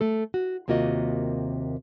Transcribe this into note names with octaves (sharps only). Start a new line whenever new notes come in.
A3 A4
F#4
D#2 C3 A#3 F4 F#4 D#5